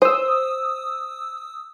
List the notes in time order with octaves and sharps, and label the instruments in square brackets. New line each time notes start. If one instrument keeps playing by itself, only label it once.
[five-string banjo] C5 [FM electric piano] D#6 E6